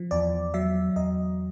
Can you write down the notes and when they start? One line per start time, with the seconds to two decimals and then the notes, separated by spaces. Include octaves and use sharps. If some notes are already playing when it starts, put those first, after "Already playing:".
Already playing: F3
0.11 E2 D5
0.54 F#3 E5
0.96 E2 D#5